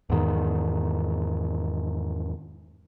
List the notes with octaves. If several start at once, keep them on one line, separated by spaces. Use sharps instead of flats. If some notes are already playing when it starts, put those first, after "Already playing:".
E2 G#2 D#3